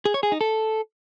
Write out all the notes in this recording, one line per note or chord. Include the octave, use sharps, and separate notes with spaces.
G#4
C#5
G#4
D#4
A4